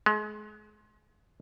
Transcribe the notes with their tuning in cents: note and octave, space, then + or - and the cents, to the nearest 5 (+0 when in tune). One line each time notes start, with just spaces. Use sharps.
G#3 +30